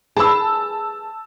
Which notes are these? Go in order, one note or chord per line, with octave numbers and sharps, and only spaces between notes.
G#4 B4 A5 E6